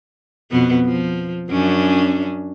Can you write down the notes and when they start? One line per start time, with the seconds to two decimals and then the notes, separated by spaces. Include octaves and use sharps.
0.51 F2 B2 B3
0.85 F3
1.50 F#2 C#4 D4